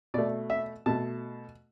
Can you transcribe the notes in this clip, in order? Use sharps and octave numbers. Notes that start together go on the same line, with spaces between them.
B2 A3 D5
E5
B2 A3 A5